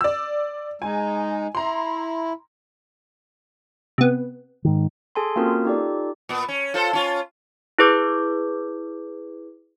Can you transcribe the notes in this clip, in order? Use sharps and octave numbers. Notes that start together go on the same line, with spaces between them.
D5 E6
G#3 D#4 G#5
E4 A#5 C6
C3 B3
G#2 D#3
G#4 A4 G#5 A5 C6
A#3 C4 C#4 F4 F#4 A#4
D#4 F4 G4 A4 D5
A#2 B3
C#4
F4 A4 C5
C#4 F4
E4 G#4 B4 D6 G6